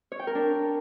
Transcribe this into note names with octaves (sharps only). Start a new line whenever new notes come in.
C#5
G5
A#4
D4